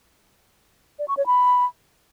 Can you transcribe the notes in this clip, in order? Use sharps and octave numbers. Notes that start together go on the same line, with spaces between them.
D5
C#6
C#5
B5